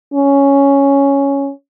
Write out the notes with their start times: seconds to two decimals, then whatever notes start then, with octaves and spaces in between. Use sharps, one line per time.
0.14 C#4